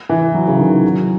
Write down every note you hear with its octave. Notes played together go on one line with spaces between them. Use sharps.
E3
F#3
C#3
D#3
F#3